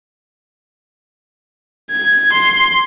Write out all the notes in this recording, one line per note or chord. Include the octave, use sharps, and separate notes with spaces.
G#6
C6